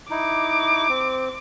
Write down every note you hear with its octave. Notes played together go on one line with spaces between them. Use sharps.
D#4 E4 D6
C4